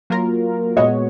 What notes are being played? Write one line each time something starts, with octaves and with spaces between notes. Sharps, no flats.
F#3 A#3 F4 A#4
A#2 G#3 B3 F#4 C#5 D#5